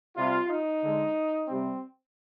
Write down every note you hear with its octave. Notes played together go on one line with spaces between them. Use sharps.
C3 G3 F4
D#4
D3 G#3
C3 G3 C4